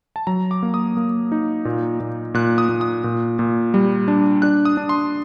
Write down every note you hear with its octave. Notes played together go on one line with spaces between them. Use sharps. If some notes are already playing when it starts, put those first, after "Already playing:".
A5
F#3 A#5
D6
A#3
D#6
A#3
D#4
A#2
A#2
A#2 F#6
D#6
A#2
D#6
A#2
A#2
G3
D4
D4 F#6
D#6
D4
C6